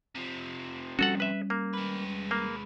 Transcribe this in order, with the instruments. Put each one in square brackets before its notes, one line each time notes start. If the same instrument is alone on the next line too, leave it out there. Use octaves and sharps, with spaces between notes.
[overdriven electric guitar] C3 F3
[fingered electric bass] G3 C#4 [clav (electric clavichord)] F#4 A4 F#5
[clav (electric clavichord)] B4 E5
A#3
[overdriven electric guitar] G#3 B4
[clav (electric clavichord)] A#3